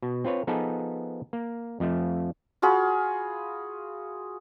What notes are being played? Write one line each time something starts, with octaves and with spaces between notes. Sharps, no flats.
B2
C4 F4 B4 C#5
F3 B3 D#4 G#4 A4 B4
A#3
F2 F3 A3
F4 F#4 G#4 B5